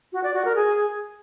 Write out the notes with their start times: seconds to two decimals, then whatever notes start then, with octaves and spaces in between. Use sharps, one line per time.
0.13 F#4
0.23 D5
0.34 F#4
0.45 A#4
0.55 G#4